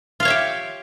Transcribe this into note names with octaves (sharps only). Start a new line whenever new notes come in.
F4 G4 C#5 E5 F5